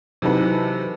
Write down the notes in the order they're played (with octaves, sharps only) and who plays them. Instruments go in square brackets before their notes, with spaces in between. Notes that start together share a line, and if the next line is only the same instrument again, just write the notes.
[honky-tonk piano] C3 E3 F#3 D#4 A4 B4